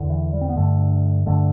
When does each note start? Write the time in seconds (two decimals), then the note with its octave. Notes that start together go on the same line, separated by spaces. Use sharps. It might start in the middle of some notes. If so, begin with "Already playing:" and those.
Already playing: E2 D3
0.10 E3
0.33 G3
0.41 C4
0.49 B3
0.56 G2 D3 A3
1.26 G2 D3 A3